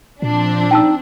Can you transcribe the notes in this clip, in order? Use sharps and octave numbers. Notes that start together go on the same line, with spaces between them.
A#2 F3 C4 D4
D#4 G5 A5 E6